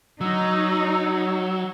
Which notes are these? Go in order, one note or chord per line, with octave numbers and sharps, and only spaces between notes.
F#3 D#4 E6